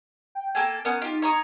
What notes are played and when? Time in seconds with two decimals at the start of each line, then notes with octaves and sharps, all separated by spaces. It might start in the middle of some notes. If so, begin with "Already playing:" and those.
0.35 G5
0.55 A#3 A4 G#5
0.85 B3 C#4 A#4
1.01 D#4 F4 G4
1.22 C#5 A#5 D#6